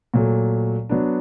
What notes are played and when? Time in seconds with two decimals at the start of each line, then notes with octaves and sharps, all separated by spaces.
0.14 A#2 F#3 A3
0.89 F#3 B3 D4